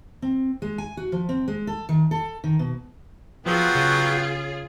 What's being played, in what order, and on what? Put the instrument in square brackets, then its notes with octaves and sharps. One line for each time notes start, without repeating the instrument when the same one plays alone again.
[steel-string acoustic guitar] C4
G#3
G#5
F#4
F3
C4
G#3
A4
D#3
A4
D#3
B2
[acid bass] F3 [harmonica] F#3 B3 G5 [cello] F4 G#4
[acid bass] C#3